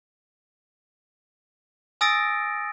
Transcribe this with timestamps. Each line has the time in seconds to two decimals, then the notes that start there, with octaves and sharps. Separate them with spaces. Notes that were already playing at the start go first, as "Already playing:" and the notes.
2.01 G#5 D#6 E6 A6 A#6 D7